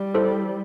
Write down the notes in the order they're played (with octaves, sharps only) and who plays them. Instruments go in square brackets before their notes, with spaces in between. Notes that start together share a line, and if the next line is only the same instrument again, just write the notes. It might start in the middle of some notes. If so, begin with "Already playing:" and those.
Already playing: [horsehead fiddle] G3
[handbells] E4 A4 C5